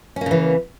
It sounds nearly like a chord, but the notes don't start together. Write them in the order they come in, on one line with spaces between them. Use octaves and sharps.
C#4 A#3 C#3 E3